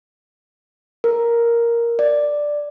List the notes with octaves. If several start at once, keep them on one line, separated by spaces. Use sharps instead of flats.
A#4
D5